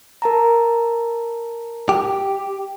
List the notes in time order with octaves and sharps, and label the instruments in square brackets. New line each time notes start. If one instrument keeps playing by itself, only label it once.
[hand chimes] A#4 A5 A#5
[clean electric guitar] G4